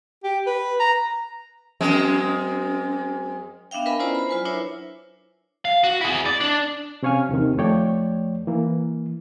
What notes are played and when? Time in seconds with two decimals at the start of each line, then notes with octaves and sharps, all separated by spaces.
0.24 G4
0.46 B4
0.80 A#5
1.81 F#2 G#3 C4
3.71 B3 D4 E5 F5 G5
3.86 A#4 B4 D#5 G#5 B5
3.99 C#4 E4 F4 C5 D5 A#5
4.15 C5 B5
4.29 F#3 F4 B4 G#5
4.45 D4 E4 A#4 C5 C#5 E5
5.65 F5
5.84 F#4
6.01 E4 G#4
6.26 D5
6.41 D4
7.03 C3 C#4 C#5 F5 G#5 F6
7.29 D#2 C3 D#3
7.57 F2 F3 A3 C#5 D5 G5
8.47 E3 A#3